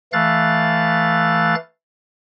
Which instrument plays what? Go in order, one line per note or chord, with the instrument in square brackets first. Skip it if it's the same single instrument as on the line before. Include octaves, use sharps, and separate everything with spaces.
[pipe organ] E3 A3 F5 F#6 A6